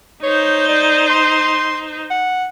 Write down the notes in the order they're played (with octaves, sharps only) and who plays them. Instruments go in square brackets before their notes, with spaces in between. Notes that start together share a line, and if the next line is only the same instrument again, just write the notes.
[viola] D#4 C5 [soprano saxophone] C#5
[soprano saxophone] D5
C6
F#5